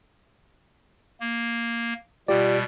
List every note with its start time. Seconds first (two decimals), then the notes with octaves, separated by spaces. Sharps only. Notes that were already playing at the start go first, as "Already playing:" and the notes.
1.20 A#3
2.28 B2 G3 F4 G4 D5